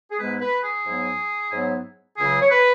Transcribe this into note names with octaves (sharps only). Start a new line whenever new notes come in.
G#4
G#2 G#3 B3 E4 B4
B4
G#4
G#2 F#3 B3 E4
G#2 F#3 B3 E4
C#2 C#3 F#3 E4 G#4
C#5
B4